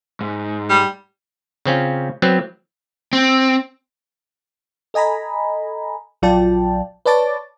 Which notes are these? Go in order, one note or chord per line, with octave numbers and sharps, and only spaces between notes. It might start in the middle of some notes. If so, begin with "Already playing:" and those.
G#2
G3
C#3 C4 C#4 F4
F#3 B3 C4
C4
A4 D#5 G#5 A#5 B5
A#1 F#3 F4 D5 G5 A5
B4 C#5 D5 A5 D6 A6